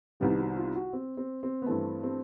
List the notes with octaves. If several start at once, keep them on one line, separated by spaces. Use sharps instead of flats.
C2 C3 D#3 G3 B3 G4
F#4
F4
F#4
C4
C4
C4
B3
G2 E3 A3 C4
C4